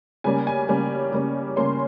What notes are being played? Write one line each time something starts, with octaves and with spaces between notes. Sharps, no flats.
C#3 G3 A#3 C#4 G#5
G#5
C#3 G3 A#3 C#4
C#3 G3 A#3 C#4
C#3 G3 A#3 C#4 C6